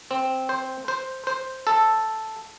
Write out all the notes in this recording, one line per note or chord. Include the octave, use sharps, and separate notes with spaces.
C4
C5
C5
C5
A4